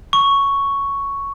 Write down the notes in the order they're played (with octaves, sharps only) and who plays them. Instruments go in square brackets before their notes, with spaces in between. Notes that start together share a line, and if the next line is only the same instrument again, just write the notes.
[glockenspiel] C#6